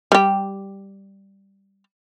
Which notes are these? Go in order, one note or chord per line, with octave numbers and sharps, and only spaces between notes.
G3 G4